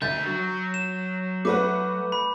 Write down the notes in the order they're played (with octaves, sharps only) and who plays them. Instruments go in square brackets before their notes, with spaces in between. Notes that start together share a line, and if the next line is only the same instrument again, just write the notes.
[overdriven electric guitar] D3 E5 [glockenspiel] G6 [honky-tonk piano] A6
[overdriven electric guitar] F#3
[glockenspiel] E7
[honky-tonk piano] A3 B4 F#5 [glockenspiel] D6
[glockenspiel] B5